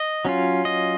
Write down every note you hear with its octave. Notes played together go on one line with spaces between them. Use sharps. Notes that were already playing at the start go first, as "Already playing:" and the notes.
Already playing: D#5
F#3 C#4 F4
D#5